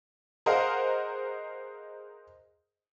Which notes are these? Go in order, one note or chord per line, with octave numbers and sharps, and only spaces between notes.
G#4 A#4 C5 D#5 F5 F#5